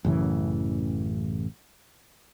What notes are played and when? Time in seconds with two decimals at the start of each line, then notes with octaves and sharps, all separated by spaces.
0.05 A1 F#2 C#3 E3